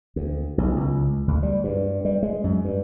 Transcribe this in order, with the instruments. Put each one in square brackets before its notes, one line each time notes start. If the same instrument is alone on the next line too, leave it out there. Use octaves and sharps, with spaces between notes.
[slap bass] D2
B1
C#2
D2
G3
G2
G3
G#3
F#2
G2